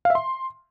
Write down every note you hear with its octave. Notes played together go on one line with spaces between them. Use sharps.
F5
E5
C6